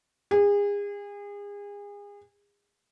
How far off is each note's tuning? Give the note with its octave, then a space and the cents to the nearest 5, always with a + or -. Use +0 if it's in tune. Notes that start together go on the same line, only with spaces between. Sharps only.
G#4 -35